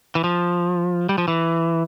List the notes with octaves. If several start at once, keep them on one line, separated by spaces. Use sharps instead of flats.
E3
F3
G3
F3
E3